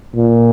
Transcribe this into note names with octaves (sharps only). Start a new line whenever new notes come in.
A#2